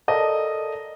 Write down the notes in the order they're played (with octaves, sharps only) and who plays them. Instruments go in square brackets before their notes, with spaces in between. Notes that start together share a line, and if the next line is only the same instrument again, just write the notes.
[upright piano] A4 A#4 D5 D#5 A5